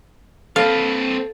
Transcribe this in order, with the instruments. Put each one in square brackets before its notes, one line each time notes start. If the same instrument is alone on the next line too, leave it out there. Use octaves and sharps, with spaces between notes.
[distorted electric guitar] C4 B4 [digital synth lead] A4 [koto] F5